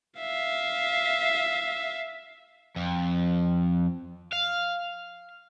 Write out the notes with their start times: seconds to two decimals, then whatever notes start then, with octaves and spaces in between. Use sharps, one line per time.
0.19 E5 F5
2.76 F2
4.32 F5